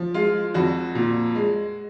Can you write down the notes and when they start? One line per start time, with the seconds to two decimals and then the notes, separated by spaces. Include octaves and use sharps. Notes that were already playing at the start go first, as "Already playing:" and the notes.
Already playing: F3
0.14 G#3 F4
0.54 F2 F#4
0.95 A#2
1.35 G#3